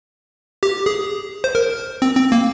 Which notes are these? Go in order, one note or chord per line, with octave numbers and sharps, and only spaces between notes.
G4
G#4
C5
A#4
C4
C4
A#3